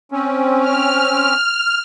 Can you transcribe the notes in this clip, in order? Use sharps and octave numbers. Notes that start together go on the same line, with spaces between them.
C4 C#4
F6